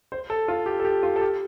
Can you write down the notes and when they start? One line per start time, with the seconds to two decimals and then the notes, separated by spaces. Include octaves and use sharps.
0.12 C5
0.30 A4
0.48 F4
0.66 G4
0.80 A4
0.85 G4
1.03 F4
1.16 A4
1.21 G4